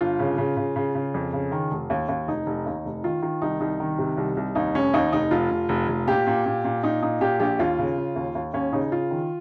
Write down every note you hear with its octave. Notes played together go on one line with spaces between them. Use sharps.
G1 F4
C#3
C#3
C#3
C#3
C#3
F2
C#3
D#3
F1
D#2
D#2
F1 D#4
F1
D#2
F1
D#3 F4
D#3 F4
C2 D#4
C2 D#4
D#3
C3
C2
C2
D#2 D#4
F1 C#4
D#2 D#4
F1 D#4
F1 F4
F1
F1
F1
A#2 G4
A#2
A#2
A#2
A#2 D#4
A#2 D#4
A#2 G4
A#1 G4
D#2 F4
C#3
C#3
D#2
D#2
D#2 C#4
C#3 D#4
C#3 F4
D#3